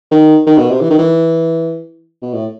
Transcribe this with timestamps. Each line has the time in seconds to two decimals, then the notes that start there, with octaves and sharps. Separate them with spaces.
0.11 D#3
0.46 D#3
0.58 B2
0.70 C3
0.81 E3
0.90 D#3
0.98 E3
2.22 B2
2.34 A2